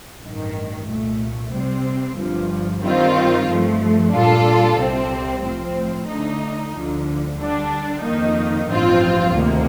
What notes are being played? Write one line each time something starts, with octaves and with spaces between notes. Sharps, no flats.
A1 G2 D#3
C2 A#2 A3
C3 G3 C4
G1 G2 F3
G2 D#3 G3 C4 F4
G2 F3 A3
A#2 G3 D4 F4 A4
C2 C3 G3 C4
A2 F3 C4
D3 A3 D#4
D2 D3 F3
D3 G3 D4
F2 D#3 A#3 D#4
A1 G2 F3 C4 F4
D2 C3 D#3 A#3